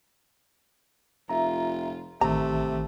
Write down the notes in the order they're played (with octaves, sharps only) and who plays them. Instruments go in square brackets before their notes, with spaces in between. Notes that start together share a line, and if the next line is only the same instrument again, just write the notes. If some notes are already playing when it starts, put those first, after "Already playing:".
[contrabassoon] F1 [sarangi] F4 [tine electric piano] E5 A#5
[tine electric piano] A1 D#3 [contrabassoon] C3 [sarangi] A3 [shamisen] A#5